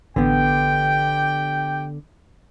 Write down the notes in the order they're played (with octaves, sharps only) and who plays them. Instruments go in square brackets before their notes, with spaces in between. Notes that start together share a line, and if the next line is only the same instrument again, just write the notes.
[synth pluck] A1 [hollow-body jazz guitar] D3 B3 [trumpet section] G4 G5